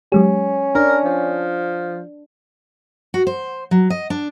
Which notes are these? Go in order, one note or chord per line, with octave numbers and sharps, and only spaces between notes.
F#3 G#3 C#4 G4
D4 A#4
F3
F#4
C5
F#3
D#5
D4